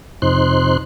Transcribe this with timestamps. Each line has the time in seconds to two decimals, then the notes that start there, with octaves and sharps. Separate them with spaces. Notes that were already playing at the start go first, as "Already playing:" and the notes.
0.22 F2 C3 D#4 C5 C6 F#6